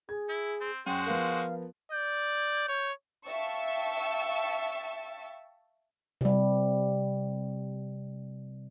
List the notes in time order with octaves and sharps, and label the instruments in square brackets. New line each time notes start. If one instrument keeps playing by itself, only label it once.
[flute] G#4 [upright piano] G#6
[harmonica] E4
C4
[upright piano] F#2 [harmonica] G#3 F#4 C5 [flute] G5
[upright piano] F3 B3 A#4 [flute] F5
[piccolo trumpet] D5 [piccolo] G6
[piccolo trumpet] C#5
[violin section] E5 F5 G5 A5 C#6 E6
[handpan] C3 G3